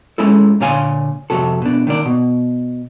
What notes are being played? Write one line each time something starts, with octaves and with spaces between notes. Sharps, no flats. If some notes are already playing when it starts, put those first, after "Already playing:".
G#3 C#4 E4 A4
A#2 D3 C#5 F5 G#5 C6
F2 C3 F#4 A4
B2 D4
D#3 A#3 D5
B2